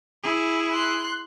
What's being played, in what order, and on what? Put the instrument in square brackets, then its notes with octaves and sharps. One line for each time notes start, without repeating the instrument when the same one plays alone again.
[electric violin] E4 G#4
[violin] C6 F#6